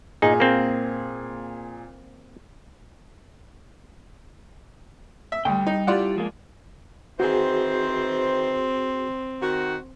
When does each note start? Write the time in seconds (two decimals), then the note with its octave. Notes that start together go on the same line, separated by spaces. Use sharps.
0.22 A#2 D#4 G#4
0.40 A#3 C4
5.32 E5
5.45 D2 G3 G5
5.67 D#4
5.87 G3 E4 F4 G4 D5 F#5
6.16 F3 G#3 A#3
7.20 D#3 E3 C4 F#4 G#4 C5
9.41 D#3 F#4